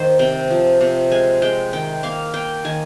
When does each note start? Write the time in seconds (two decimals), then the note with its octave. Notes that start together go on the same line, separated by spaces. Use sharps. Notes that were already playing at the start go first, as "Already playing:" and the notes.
Already playing: D#3 A#3 C5
0.19 C3 G5
0.51 F3
0.81 C3
1.11 G#3 G#5
1.42 G#3 G5
1.73 D#3 G5
2.03 A#3 F5
2.34 A#3 G5
2.65 D#3 G#5